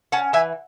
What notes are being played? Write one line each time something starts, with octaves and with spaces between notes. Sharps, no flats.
C#4 F#5 A5
E3 E5 G#5